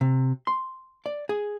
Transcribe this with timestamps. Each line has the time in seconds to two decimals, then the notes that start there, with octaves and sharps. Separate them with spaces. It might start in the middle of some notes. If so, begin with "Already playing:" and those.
0.01 C3
0.47 C6
1.06 D5
1.29 G#4